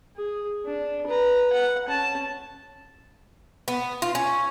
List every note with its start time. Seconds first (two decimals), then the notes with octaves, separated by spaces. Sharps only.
0.16 G#4
0.66 D4
1.07 B4 A#5
1.53 F#5
1.87 C#4 A5
3.68 B3
4.02 F4
4.15 C#4